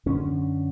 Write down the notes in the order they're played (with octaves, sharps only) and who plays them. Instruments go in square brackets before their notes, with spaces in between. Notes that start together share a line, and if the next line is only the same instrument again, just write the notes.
[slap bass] F#2 D3 C#4